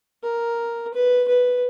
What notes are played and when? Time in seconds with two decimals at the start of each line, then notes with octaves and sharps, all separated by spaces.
0.23 A#4
0.94 B4
1.28 B4